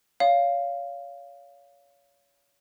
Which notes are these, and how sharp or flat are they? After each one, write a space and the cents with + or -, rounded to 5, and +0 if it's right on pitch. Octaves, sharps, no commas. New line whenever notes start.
C#5 +30 F5 -5